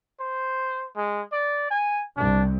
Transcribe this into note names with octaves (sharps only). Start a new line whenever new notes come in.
C5
G#3
D5
G#5
C2 D4